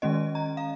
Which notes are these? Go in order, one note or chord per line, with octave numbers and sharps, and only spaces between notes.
D#3 G#3 C#4 D#5
A#5
F5